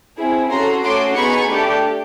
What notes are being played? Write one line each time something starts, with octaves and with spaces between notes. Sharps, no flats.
C4 E4 G#4
C#4 F#4 A4 A#5 C6
A3 C#4 F#4 A4 C6 D6
B3 D#4 G#4 B5 C#6
A3 D4 G4